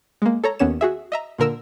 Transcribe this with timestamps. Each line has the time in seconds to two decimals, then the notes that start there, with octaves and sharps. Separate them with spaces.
0.22 G#3 A#3
0.44 A4 C#5 A#5
0.59 D#2 B3 C#4 C#5 E7
0.81 F#4 G#4 E5
1.12 D#5 E5 A#5
1.38 A#2 D3 A#4 E6 E7